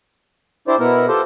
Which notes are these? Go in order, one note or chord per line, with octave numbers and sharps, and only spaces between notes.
D4 E4 G4 C5 D5
B2 B3 E4 A#4
F4 G4 A4 C5